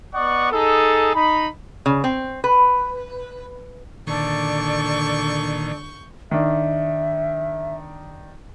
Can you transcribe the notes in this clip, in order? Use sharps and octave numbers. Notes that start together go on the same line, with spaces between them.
B3 D5 D#5 F#5 C#6
D#4 G#4 A4
D#4 B5
C#3
C4
B4
A#2 D3 D#3 A4 D5 C#6 G6
D#3 D4 E5